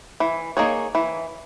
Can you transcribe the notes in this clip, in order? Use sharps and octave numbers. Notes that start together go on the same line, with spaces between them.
E3
A#3 D#4 G#4 C#5
E3